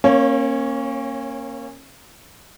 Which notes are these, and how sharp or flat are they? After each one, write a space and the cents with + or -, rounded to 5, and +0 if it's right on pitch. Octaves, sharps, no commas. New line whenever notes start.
A#3 +0 C#4 -30 C#5 +0